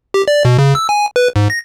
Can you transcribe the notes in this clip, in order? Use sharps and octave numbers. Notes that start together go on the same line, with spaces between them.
G4
D5
B2
C#3
E6
G#5
B4
G#2
A#6